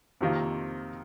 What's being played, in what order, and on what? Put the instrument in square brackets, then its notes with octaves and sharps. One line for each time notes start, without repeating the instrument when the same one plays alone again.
[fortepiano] F2 C3 D#3 A#3 F4